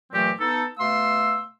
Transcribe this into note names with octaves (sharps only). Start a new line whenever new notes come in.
A#2 E3 F#3 A3 C4 G4
B3 D#4 A4
B2 A3 F5 C6 E6